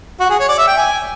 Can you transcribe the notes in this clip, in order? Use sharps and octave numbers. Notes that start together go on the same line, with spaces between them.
F#4
G#4
C#5
D5
E5
G5
G#5